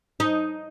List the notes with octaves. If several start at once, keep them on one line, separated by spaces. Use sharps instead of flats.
D#4